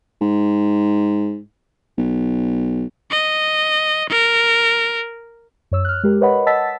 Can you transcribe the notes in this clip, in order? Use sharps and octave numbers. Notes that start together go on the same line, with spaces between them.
G#2
B1
D#5
A#4
F#2 C#5 E6
F6 F#6
G#3 G4 A#4
A#4 B4 C#5 D#5 F#5 B5
D#5 F#5 A5 E6 A6 B6